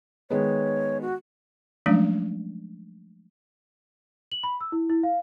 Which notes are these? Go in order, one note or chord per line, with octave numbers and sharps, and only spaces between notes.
D#3 G#3 B3 C#5
F#4
F3 F#3 G#3 A3 C#4 D4
F#7
B5
E6
E4
E4
F5